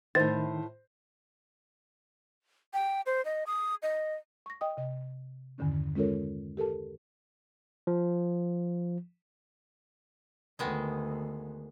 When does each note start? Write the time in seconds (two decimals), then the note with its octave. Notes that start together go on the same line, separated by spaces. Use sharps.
0.15 A2 D#3 E4 C5 A6
2.74 G5
3.06 C5
3.25 D#5
3.47 D#6
3.83 D#5
4.46 C#6 A#6
4.61 D#5 G5 D#6
4.77 C3 D#5
5.58 E2 G2 D3 D#3 C#4
5.95 G#3 C#4 F4 A4 A#4 C#5
6.57 G4 A4 A#4 A5
7.87 F3
10.59 D2 D#3 G#3 B3